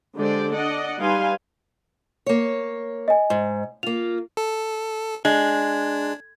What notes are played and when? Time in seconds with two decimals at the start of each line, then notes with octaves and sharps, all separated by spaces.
0.15 D3 G#3 G4 C5 D5
0.51 D4 D5 D#5 F#5
0.99 G3 D#4 B4 F5 G#5 C6
2.26 A#3 C#5
3.08 D#5 G#5
3.30 G#2
3.83 A#3 F4 F7
4.37 A4
5.25 G#3 D4